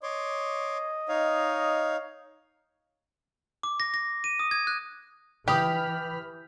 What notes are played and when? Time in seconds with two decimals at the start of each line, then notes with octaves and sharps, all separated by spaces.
0.03 C#5 D#5 C6 D6
1.09 D#4 C#5 F5
3.63 D6
3.80 A#6
3.94 A#6
4.24 D#7
4.39 D#6
4.51 G#6
4.67 F#6
5.48 E3 G4 B5 D#6 F6 G6 B6